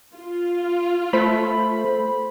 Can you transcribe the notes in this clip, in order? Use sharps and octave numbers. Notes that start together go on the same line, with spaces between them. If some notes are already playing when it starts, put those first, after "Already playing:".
F4
A3 C5 B5